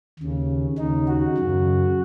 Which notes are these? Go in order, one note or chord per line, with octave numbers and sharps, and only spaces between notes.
D#2 C#3
D#2 C#3 D#4
F#4
F#2 C#3